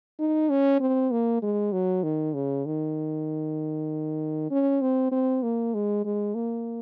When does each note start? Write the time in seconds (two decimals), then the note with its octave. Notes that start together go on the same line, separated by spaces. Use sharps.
0.19 D#4
0.50 C#4
0.80 C4
1.11 A#3
1.42 G#3
1.72 F#3
2.03 D#3
2.35 C#3
2.66 D#3
4.51 C#4
4.82 C4
5.12 C4
5.43 A#3
5.74 G#3
6.05 G#3
6.35 A#3